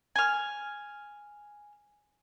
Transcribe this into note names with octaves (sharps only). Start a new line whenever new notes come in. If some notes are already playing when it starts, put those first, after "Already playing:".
G#5 F6